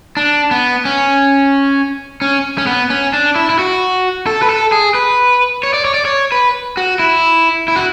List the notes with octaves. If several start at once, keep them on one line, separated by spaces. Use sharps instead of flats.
D4
B3
C#4
C#4
C#4
B3
C#4
D4
E4
E4
F#4
A4
B4
A4
G#4
B4
C#5
D5
C#5
D5
C#5
B4
F#4
E4
E4
F#4